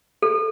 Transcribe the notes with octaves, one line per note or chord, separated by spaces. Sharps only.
A4